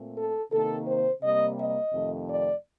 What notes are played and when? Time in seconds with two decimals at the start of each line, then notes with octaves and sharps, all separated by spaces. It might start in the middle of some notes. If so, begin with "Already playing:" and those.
Already playing: A#2 A3 C4
0.16 A4
0.51 C3 D#3 A#3 A4
0.87 C5
1.22 C3 G3 A#3 D#5
1.58 D#5
1.93 F2 C3 D#3 A3
2.29 D5